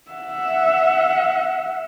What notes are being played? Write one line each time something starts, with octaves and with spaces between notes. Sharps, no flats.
E5 F#5